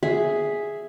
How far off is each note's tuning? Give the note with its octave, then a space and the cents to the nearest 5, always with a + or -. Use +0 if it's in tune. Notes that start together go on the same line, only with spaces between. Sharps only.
G#4 +0 E5 +0 G#5 +0